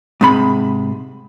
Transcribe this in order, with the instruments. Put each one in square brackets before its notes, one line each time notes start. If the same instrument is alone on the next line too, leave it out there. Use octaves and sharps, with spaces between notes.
[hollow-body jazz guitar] G#2 C3 B5